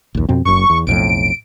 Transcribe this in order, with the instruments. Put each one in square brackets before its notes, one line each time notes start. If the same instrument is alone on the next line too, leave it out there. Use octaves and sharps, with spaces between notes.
[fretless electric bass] A#1 D#2
F2 B2 C4
[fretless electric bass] F#1 F#2 [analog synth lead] C#6
[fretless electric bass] E2
[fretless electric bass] B1 F2 A2 [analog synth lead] D7